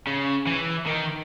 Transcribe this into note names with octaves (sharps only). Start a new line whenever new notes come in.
C#3
E3
D#3